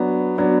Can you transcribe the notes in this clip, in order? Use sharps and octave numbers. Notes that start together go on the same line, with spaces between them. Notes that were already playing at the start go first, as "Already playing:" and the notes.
Already playing: F#3 B3 D4
F#3 B3 D4